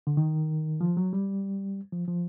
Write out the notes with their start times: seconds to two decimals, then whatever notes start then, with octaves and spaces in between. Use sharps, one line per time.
0.07 D3
0.17 D#3
0.81 F3
0.97 F#3
1.13 G3
1.93 F3
2.08 F3